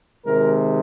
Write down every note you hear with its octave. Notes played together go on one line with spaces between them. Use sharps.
C3 D#3 G#3 A#4